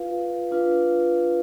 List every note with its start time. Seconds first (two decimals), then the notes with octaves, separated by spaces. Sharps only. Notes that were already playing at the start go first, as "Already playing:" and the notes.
Already playing: F4 B4 F5
0.51 D4 F4 B4 F5